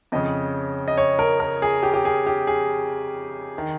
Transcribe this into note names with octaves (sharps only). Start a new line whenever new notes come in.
F2 C#3 D#5
D#5
C#5
A#4
A#4
G#4
G4
G4
G#4
G4
G#4
D#3